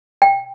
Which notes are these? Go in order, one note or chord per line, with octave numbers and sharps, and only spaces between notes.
G5